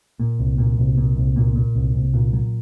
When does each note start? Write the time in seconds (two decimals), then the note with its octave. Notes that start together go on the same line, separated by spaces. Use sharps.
0.20 A#2
0.39 C2
0.58 A#2
0.78 C2
0.98 A#2
1.17 C2
1.36 A#2
1.55 A#2
1.75 C2
1.95 C2
2.14 A#2
2.33 F#3